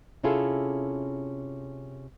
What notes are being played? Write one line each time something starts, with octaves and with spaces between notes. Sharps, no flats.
C3 C#4 E4 F4 G#4 A4